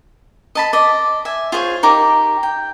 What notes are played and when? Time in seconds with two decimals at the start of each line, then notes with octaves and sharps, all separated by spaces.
0.55 D#5 A5 B5
0.73 D5 D#5
1.25 E5 G#5
1.52 F4 G#4 C5 C#5
1.83 D#4 G4 A#4 D6
2.43 G5